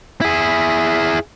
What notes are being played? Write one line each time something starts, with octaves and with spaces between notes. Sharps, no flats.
E4 G#4